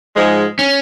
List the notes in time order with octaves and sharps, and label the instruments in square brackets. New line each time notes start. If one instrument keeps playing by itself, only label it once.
[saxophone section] G#2 F3 G#3
[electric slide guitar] C#4